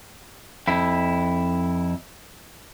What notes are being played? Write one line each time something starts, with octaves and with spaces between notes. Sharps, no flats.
F2 E4